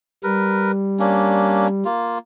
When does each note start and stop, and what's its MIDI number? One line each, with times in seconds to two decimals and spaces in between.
0.24 1.84 55
0.24 0.71 70
0.24 0.71 71
1.00 1.68 58
1.00 1.68 61
1.00 1.68 62
1.85 2.18 58
1.85 2.18 65